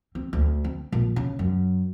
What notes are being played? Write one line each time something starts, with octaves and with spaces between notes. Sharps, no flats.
C4
D2
C4
A#1
C#3
F#2